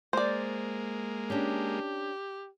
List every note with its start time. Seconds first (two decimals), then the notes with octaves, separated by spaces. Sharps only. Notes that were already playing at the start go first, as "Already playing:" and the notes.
0.13 G#3 A#3 C5 D5
1.30 C#4 D4 G4